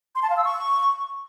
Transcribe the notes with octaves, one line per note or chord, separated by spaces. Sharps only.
C6
A5
F5
E6
C#6